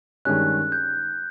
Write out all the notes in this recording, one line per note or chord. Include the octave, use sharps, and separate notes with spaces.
G2 D#3 G#3 C#4 F#6
G6